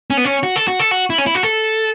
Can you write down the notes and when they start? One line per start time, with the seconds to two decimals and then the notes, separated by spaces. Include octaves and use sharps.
0.10 C#4
0.17 B3
0.25 C#4
0.43 F#4
0.56 A4
0.68 F#4
0.79 A4
0.91 F#4
1.10 E4
1.18 C#4
1.26 E4
1.35 F#4
1.43 A4